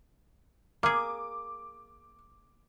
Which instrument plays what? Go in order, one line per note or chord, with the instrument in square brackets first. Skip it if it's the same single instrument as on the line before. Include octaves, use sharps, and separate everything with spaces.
[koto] A#3 G#4 [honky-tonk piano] D6